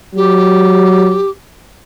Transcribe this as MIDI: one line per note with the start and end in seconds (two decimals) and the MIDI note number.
0.15 1.19 54
0.15 1.30 67